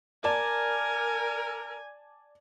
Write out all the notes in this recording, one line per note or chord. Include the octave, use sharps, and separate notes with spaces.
A#4 D5 G#5 A5